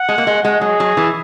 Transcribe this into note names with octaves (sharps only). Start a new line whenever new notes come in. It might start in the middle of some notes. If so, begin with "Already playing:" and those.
Already playing: F#5
G#3
A#3
G#3
G#3
F#3 G#4
F#3
E3